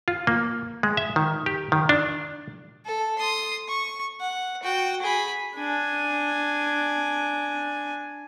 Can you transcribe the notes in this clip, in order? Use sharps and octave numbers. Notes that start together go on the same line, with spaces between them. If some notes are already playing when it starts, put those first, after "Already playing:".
F4
A#3
G#3
E5
D#3
G4
D#3
D4
A4
C6 D#6
C#6
F#5
F#4 G5
G#4 B5
D4 G#5